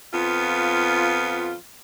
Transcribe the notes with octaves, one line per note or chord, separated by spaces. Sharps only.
F2 B3 F4